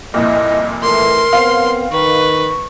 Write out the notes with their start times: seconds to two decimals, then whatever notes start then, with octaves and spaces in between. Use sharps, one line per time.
0.14 C2 F2 A#2 E4 D#5
0.83 E3 A3 A#4 C6
1.33 B3 C4 F5
1.92 D#3 B4 C#6